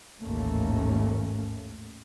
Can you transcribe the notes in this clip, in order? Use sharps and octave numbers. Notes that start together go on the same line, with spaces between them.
A1 D#2 G#2 A3 A#3 C#4